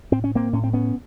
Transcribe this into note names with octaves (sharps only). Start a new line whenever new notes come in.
A2 C4
C#4
A#3 C4
A2 C#4
C4
B3 C#4